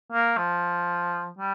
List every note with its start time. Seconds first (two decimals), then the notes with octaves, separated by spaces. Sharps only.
0.12 A#3
0.37 F3
1.39 G3